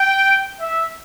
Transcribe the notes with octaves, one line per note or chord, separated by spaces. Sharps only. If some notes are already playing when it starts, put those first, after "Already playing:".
Already playing: G5
E5